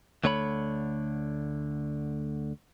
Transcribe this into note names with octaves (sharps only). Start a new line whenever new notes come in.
D2 D3 A3 C#5 A#5 B5